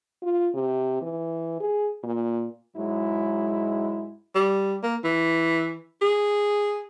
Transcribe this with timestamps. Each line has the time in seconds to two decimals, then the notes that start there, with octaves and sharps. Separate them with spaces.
0.22 F4
0.54 C3
1.02 E3
1.60 G#4
2.03 A#2
2.77 G#2 F#3 G#3 E4
4.35 G3
4.83 A#3
5.04 E3
6.02 G#4